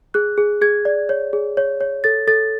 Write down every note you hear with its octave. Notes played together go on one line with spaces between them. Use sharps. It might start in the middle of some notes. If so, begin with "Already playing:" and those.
G#4 F#6
G#4
G#4 G#6
D5
C#5
G#4
C#5
C#5
A4 A6
A4 A6